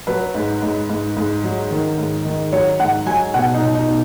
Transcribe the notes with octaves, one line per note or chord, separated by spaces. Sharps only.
F#3 B4
G#2
G#2
G#2
G#2
F#3
D#3
G#2
D#3
F#3 C#5
G#2 F#5
F#3 G#5
B2 F#5
D#4
B2
D#4
B2